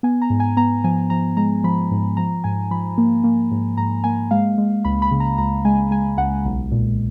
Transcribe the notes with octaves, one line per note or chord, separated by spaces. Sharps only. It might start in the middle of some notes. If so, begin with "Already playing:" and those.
B3 G#5
A#5
G#2
G#5
B3 A#5
F3 G#5
F3 A#5
G#3 A#5
F3 B5
G#2
F3 A#5
G#2 G#5
F3 B5
A#3
A#3
G#2
G#2 A#5
A#3 G#5
G#3 F5
G#3
C#2 B5
B5
C#3
A#5
C#2 A#5
G#3 G#5
G#3 G#5
C#2 F#5
B1
A#2